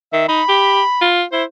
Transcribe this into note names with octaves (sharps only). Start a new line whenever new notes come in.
D#3 E5
D#4 B5
G4
F4
E4 C5